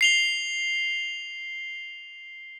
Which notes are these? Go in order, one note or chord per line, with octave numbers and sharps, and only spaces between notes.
C7 F7 G7